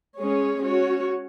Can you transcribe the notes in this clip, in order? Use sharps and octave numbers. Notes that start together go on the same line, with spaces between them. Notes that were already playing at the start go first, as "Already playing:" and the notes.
G#3 C#4 G#4 C#5
C#4 F#4 C#5